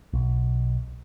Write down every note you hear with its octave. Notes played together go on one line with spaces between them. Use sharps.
B1